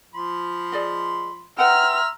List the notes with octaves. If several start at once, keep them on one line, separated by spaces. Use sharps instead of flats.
F3 B5 C6
G#4 D5 D#5
B4 E5 F#5 G5 A#5 C6 E6 F6